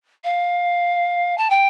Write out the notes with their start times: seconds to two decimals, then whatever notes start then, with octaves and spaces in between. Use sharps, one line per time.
0.24 F5
1.38 A5
1.50 G5